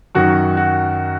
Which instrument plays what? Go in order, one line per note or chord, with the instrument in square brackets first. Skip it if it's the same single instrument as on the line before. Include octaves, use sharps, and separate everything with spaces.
[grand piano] F#2 D#3 F#3 F#4
F#4